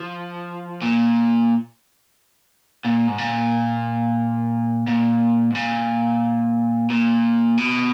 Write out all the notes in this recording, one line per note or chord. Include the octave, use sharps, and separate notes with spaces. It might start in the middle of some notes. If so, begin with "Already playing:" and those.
Already playing: F3
A#2
A#2
G#2
A#2
A#2
G#2
A#2
A#2
B2